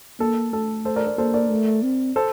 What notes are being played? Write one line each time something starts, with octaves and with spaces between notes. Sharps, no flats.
A#3 A4
A3 A4
A4 C5
A#4 D5
A#4 D5
A#3 A4 C5
A#4 D5
A3
C4
A4 C5